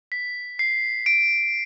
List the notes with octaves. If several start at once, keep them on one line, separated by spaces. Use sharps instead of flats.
B6
C7
D7